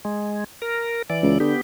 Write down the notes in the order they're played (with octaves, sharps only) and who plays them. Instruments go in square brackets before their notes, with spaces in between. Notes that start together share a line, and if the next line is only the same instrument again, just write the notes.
[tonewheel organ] G#3
A#4
E3 D5
[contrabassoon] C#2
[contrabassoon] D3 [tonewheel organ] B3 G4